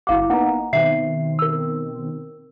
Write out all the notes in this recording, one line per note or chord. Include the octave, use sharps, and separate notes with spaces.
G1 E4 F#4 F5 D6
A#3 B3 D#4 F#5 A#5
B2 D#3 C4 E5 C7
A#4 E6